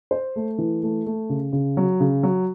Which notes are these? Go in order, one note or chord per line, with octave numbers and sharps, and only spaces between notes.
C5
A3
E3
A3
A3
C#3
C#3
F#3
C#3
F#3